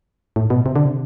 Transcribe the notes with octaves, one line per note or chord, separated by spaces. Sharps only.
A2
B2
C3
D3
C3